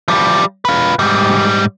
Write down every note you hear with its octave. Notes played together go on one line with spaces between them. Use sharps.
F3 G3
F4 B4
G#2 G3